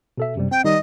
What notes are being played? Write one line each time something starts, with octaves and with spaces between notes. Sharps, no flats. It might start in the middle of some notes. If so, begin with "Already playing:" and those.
B2 A4 E5
F#2 C3 G3
C4 G5
D#3 G3 D#4 D#5